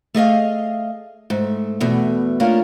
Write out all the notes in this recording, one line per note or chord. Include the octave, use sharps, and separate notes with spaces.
A3 G#4 D#5 F5
G#2 A3
E2 B2 A3
A3 A#3 C#4 D4 F4 A#4